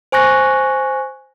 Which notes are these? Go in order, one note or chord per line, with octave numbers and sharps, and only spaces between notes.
C5 G#5 C#6 F#6 A#6